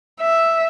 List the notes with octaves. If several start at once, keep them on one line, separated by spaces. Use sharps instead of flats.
E5